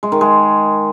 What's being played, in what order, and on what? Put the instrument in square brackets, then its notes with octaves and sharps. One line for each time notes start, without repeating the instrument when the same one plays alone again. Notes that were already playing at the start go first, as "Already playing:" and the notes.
[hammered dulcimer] G#3
D#3
G#3